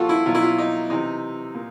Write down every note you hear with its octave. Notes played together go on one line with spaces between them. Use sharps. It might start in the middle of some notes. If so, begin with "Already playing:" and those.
Already playing: A#2 F3 F4 F#4 A4
E4
B2 F#3 F4
E4
F4
D#4
C3 E3 D#4
A#2